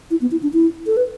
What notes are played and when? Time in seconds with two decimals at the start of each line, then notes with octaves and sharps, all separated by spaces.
0.11 E4
0.21 B3
0.31 E4
0.43 D4
0.53 E4
0.86 A4
0.97 B4